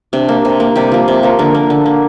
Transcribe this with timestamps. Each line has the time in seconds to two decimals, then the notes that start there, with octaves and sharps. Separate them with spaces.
0.13 C3 D4
0.29 A#3
0.45 C3
0.60 A#3
0.76 C3 G3 G4
0.92 F3 A#3
1.08 C3
1.23 F3 A#3
1.39 D3 A#3 A#4
1.55 A#3
1.70 D3
1.86 A#3